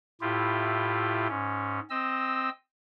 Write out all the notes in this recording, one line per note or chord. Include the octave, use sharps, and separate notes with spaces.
A2 E4 F4 G4
G#2 C#4
C4 D#5 E6